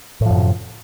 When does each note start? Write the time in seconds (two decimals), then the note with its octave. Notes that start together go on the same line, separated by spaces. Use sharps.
0.21 A2
0.25 F3
0.30 F#2
0.35 C3